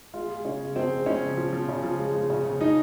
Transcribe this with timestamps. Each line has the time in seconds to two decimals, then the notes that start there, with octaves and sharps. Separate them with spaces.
0.14 G#3 F4
0.29 G#3
0.45 C#3 C#4
0.60 G#3
0.76 F3 C4
0.91 G#3
1.06 C#3 C#4
1.22 F3
1.37 F3
1.53 F3
1.69 C#3
1.83 F3
1.99 G#3
2.14 G#3
2.30 C#3
2.45 C#3
2.61 F3 D#4